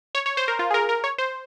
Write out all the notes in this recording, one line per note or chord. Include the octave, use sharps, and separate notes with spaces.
C#5
C#5
C5
A#4
F4
G#4
A#4
A#4
C#5
C5